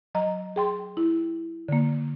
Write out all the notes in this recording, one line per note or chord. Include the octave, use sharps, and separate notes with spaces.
F#3 D#5 A#5
G#4 G5 C6
E4
D3 A#3